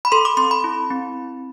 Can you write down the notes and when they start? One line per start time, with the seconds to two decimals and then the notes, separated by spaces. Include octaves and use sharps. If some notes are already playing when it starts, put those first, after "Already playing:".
0.05 B5
0.12 A4 C6
0.25 D6
0.37 C4 C6
0.51 B5
0.64 E4
0.91 C4